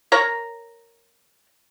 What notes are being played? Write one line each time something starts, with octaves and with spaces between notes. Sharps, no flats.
A#4 C#5 A#5